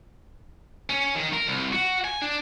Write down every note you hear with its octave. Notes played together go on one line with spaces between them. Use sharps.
C#4
D#3
A#4
C2
F#4
G#5
D4